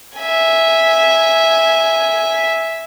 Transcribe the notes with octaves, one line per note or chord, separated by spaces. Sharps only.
E5 G#5